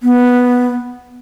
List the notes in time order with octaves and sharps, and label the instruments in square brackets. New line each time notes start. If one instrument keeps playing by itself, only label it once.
[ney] B3